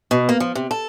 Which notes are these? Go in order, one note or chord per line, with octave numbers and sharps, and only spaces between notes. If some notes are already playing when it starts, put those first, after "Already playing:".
B2
A#3
F3
C3
A4